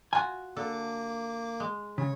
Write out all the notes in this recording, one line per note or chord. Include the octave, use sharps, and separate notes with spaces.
F4 F#4 G#5
D3 A#3 A4 D6
G#3
C#3 C#5